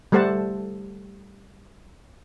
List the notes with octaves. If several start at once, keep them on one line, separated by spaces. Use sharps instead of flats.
G3 A3 A4 C5 F#5 A5